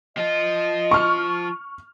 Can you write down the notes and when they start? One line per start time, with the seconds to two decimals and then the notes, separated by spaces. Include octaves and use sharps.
0.17 F3 F4 D#5
0.91 C#6 F6